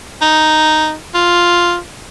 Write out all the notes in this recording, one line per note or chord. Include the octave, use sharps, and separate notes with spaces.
D#4
F4